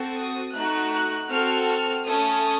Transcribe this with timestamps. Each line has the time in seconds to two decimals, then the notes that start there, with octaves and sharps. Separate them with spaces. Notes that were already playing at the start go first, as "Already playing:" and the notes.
Already playing: C4 F#4 A4
0.16 D#6
0.53 A3 D#4 F#4 F#6
0.91 F#6
1.29 C4 F#4 A4 F6
1.67 F6
2.04 A3 C#4 A4 D#6